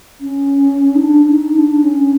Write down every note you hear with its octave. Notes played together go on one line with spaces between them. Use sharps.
C#4
D#4
D4
D#4
D4
C#4